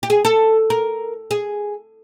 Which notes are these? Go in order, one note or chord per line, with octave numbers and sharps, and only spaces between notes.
G4
G#4
A4
A#4
G#4